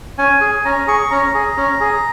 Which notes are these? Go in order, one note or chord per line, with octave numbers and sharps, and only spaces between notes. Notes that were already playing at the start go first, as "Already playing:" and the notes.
C#4 G#5
G#4
C#4 A#5
G#4 C#6
C#4 A#5
G#4
C#4
G#4